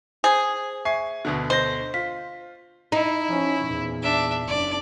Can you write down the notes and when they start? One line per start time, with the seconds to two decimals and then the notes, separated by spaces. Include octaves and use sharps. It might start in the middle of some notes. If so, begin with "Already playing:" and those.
0.24 G#4 C5
0.85 E5 G#5 C#6 C7
1.25 D2 B2 D3
1.50 C5 D#5 A#6
1.94 F4 B6
2.92 D#4 E4
3.27 F3 C#4
3.63 E2 A#2
4.02 D4 E5
4.47 F#1 D4 D5